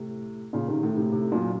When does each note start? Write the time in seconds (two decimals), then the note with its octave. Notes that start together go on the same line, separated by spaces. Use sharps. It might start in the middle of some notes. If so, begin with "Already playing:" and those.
Already playing: A2 C3
0.53 A#2 C#3
0.68 C3 D#3
0.83 A2
0.97 A2 C3
1.12 A2 C3
1.32 F#2 A#2